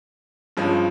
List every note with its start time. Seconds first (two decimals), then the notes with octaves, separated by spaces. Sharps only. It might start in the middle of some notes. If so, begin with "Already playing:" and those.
0.57 G2 F3 G#3 C#4